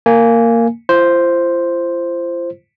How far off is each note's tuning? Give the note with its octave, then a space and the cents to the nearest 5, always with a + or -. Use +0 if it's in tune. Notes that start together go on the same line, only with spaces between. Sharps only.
A#3 -15 G#5 +0
F4 -40 C5 +0